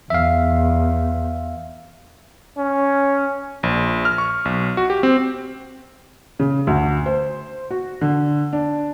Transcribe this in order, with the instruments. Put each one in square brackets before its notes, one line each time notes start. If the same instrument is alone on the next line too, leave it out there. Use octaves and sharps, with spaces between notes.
[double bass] E2 [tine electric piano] E5 F5
[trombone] C#4
[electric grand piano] A#1
F6
C#6
B1
F#4
G4
C4
[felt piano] C#3
D2
C5
F#4
D3
D4